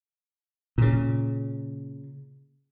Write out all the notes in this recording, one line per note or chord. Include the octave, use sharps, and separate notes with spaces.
A#2 C#3